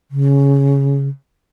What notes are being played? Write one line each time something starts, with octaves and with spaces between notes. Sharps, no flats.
C#3